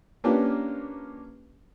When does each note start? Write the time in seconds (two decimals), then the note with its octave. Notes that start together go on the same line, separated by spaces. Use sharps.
0.24 A#3 C#4 D4 F4 G4 B4